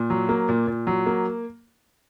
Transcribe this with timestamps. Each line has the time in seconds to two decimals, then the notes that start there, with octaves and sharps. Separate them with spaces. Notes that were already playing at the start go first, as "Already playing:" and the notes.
Already playing: A#2
0.10 F#3
0.29 A#3
0.49 A#2
0.67 A#2
0.87 F#3
1.06 A#3